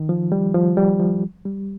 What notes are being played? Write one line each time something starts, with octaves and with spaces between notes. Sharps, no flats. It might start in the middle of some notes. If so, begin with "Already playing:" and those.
Already playing: D#3
F3
G3
F3
G3
F3
G3